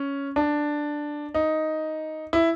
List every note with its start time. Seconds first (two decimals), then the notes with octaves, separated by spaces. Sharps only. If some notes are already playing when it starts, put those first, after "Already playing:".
Already playing: C#4
0.36 D4
1.34 D#4
2.33 E4